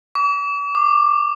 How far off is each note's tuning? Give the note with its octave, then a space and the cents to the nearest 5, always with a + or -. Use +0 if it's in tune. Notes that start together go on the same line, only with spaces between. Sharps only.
D6 -45
D6 +20